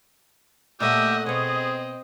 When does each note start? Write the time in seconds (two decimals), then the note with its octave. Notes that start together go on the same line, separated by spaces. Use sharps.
0.80 A#2 A3 G4 D#5 E5 F#5
1.26 B2 C4 G#4 C#5 D#5